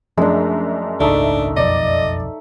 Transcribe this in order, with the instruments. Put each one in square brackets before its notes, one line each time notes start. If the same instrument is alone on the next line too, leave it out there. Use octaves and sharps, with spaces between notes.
[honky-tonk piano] F#2 [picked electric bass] F3 A3 [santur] G#3 D4
[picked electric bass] G#1 C#2 [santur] A3 D#4 E5 [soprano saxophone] D4
[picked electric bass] F#1 B1 F2 [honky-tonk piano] D5 [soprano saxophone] D#5